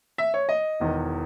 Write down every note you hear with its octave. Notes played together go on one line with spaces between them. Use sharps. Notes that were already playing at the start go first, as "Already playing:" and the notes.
E5
C#5
D#5
E1 E2 D#3